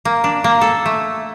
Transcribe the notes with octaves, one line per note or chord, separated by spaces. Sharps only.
A#3
D4
A#3
A4
A3